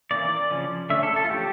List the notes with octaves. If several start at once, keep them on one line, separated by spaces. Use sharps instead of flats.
E3 A#3 C#4 D5
C#3 F3 C#4
D3 A3 C#4 E5
A4
A4
F4
F3 A3 C#4 G4